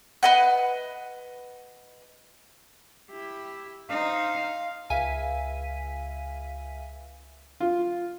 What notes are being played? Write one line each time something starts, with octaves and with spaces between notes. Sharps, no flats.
B4 D#5 F#5
E4 G4
D#4 C5 F5
C#2 E5 F5 G#5 B6 D#7
F4